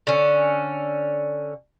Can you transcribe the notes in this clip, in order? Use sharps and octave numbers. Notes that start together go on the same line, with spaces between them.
D3 C#4